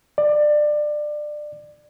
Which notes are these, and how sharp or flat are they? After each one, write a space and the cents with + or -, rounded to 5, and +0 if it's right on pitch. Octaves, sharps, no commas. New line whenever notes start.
D5 +25